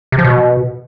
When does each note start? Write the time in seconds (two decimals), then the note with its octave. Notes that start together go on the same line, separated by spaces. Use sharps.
0.12 C3
0.18 F3
0.25 B2